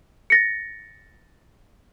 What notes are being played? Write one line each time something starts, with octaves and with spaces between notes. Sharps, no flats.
A6 A#6 C#7